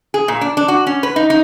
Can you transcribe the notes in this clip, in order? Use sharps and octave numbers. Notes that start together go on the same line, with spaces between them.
G#4
A#2
D4
D4
F#4
C#4
B4
D#4
D#4